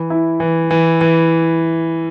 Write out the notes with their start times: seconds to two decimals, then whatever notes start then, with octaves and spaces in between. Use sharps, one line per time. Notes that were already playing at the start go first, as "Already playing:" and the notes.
Already playing: E3
0.10 E4
0.40 E3
0.71 E3
1.01 E3